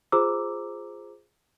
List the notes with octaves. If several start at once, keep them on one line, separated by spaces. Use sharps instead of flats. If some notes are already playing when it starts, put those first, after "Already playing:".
F4 G#4 C5 A#5 D6 E6